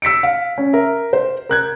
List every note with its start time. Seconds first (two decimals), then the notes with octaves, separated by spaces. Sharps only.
0.02 E6 B6 C#7 D7
0.23 F5
0.58 C#4
0.73 A#4 E5
1.13 C5
1.49 A#4 F#6 G#6